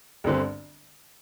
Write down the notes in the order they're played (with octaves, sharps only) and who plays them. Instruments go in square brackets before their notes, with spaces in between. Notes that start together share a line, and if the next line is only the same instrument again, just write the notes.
[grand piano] G1 G2 D3 C4